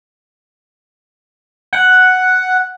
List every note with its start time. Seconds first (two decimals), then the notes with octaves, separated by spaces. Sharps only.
1.73 F#5